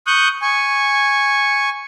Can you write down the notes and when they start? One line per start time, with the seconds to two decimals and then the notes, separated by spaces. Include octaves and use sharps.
0.07 C#6 D#6 F#6 G6
0.42 G#5 C#6